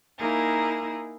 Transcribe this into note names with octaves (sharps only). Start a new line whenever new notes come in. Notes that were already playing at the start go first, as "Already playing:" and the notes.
A#3 D#4 E4 G#4 A#4